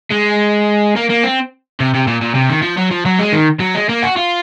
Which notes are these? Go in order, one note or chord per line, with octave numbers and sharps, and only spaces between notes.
G#3
A#3
A#3
C4
C3
C3
A#2
A#2
C3
D#3
F3
F#3
F3
F#3
G#3
D#3
F#3
G#3
A#3
F#4
F4